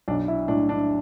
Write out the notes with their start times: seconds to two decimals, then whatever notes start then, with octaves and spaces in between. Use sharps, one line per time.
0.08 B1 D4
0.28 E4
0.48 A2 D4
0.69 D4